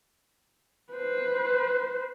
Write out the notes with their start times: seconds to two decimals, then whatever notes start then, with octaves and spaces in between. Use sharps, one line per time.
0.93 B4 C5